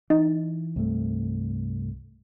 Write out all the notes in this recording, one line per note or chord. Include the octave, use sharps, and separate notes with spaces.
E3 D#4
C2 G2 A3